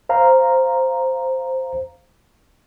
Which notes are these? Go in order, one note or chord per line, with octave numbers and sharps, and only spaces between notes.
C5 F5 A#5